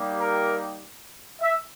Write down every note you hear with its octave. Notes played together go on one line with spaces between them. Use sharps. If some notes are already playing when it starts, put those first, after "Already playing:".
Already playing: G3 A#3 D#4 G4
A#4
E5